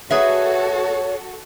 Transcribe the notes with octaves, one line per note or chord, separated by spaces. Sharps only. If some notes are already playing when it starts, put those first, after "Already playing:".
F#4 G#4 A4 B4 C#5 E5